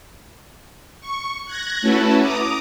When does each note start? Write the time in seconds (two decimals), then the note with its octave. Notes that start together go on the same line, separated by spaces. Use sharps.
1.01 C#6
1.46 F#6 G#6 A#6
1.81 A3 C#4 E4 F#4 A4 B4
2.20 A#5 D6 D#6